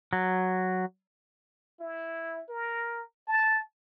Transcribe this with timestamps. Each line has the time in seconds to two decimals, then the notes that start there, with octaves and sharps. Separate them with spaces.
0.13 F#3
1.80 E4
2.49 A#4
3.27 A5